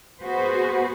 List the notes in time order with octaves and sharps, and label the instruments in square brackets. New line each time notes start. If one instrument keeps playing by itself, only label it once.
[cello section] B3 F#4 G#4 B4 C5